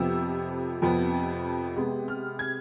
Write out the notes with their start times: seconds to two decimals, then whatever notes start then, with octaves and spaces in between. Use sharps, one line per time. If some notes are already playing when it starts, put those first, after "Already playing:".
Already playing: F2 C3 F3 B3 E6
0.82 F2 C3 F3 B3
1.76 C3 G#3 B3
2.08 F6
2.39 G#6